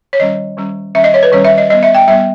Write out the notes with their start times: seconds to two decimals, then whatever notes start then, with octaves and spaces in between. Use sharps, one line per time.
0.13 C#5
0.20 D#3 G3 C#4 D#5
0.57 D#3 G3 C#4
0.95 D#3 G3 C#4 E5
1.04 D#5
1.14 C#5
1.23 B4
1.32 D#3 G3 C#4 C#5
1.45 E5
1.58 D#5
1.70 G3 B3 D#5
1.83 E5
1.95 G5
2.08 G3 B3 E5